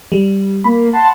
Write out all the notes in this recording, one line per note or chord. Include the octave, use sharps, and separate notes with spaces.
G3
A#3 B5
F#5 A5 C6